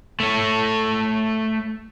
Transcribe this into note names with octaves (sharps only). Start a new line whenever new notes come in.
A3 C#5